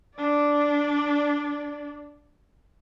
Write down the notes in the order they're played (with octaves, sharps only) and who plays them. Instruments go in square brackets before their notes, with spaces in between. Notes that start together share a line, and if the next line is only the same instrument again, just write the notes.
[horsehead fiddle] D4 D5